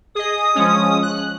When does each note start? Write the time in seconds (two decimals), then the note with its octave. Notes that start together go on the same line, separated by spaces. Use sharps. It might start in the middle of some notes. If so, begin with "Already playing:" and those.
0.15 G#4 D#5 D#6
0.55 F3 G#3 C#4
1.03 F#6